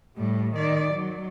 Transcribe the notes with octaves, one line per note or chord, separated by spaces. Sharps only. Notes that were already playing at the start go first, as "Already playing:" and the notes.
A2 G3
D#3 D5
F#3